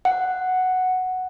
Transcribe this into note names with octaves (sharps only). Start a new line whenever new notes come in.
F#5